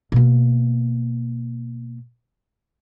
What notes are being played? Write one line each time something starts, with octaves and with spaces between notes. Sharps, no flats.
B2 A#3